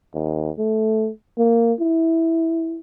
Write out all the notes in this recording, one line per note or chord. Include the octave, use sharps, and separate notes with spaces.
D#2
A3
A#3
E4